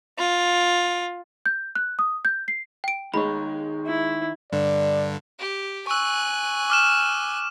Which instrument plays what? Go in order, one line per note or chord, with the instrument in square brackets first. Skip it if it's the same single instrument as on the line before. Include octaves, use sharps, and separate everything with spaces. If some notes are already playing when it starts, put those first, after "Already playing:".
[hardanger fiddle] F4
[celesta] G6
F#6
D#6
G6
C7
[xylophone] G5 D7
[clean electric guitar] D#3 C#5 [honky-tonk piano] G#3 [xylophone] B5
[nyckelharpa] E4
[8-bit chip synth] G2 D3 [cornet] D5
[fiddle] G4
[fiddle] G#5 F#6 [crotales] C#6 E6
[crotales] D6 F6 E7